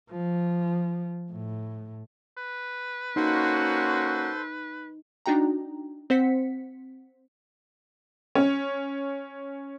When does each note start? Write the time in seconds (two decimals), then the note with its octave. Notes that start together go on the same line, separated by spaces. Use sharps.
0.11 F3
1.32 A2
2.37 B4
3.16 A#3 C#4 D#4 F#4 A4 C5 C6
5.26 D4 D#4 F#4 G5 A#5
6.10 C4 C5 F#5 B6 C#7
8.35 C#4